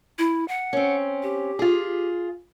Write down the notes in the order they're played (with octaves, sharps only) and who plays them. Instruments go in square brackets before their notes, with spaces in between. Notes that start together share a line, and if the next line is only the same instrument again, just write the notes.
[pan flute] E4
F#5
[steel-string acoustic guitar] C4 C#4
[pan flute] G4
[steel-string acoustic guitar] F4 G#4